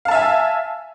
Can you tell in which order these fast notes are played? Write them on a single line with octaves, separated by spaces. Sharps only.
F5 A5 E5 G#5